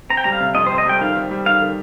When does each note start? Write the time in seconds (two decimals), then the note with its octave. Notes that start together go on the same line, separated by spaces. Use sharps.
0.10 C4 A#5
0.17 G5
0.24 G3 A#5
0.32 F5
0.40 C3
0.55 F2 D#5
0.67 C5
0.71 C4
0.78 D#5
0.86 G3 G5
1.01 D#3 F5
1.16 C4
1.31 G3
1.46 D#3 F5
1.61 D#3